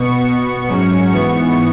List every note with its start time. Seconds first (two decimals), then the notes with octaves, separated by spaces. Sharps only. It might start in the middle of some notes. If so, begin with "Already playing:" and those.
Already playing: B2 B3 C#6
0.25 B2 B3
0.68 G#2 F#3 C#4
1.11 G#2 E3 B3 C#6